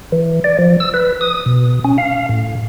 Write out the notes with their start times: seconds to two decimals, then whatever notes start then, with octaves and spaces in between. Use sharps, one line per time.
0.12 E3
0.44 D5
0.59 F3
0.80 E6
0.94 B4
1.21 D#6
1.46 B2
1.85 C#4
1.98 F5
2.29 A2